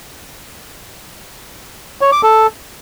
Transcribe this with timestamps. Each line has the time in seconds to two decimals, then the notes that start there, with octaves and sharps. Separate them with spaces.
2.01 C#5
2.12 D6
2.23 A4